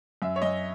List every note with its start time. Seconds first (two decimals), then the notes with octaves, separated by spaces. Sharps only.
0.22 F#2 E5
0.36 C#5
0.42 F#2 D#5